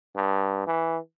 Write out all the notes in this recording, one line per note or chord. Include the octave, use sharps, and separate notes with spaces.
G2
E3